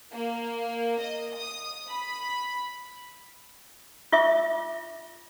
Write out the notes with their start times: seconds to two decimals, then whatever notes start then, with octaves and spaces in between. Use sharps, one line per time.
0.12 A#3
1.01 D#5
1.37 D#6
1.89 B5
4.12 F4 E5 D6